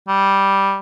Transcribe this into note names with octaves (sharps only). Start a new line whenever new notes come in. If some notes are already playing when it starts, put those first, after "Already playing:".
G3